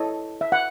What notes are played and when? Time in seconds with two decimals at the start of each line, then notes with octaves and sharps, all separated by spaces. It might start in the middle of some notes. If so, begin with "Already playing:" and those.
Already playing: E4 A4 C#5 D#5
0.41 E5
0.52 F#5